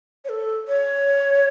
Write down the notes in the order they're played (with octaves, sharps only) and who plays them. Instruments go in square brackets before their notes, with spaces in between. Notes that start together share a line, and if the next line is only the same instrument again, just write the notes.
[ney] C#5
A4
C#5